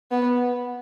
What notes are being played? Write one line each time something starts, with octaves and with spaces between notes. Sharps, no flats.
B3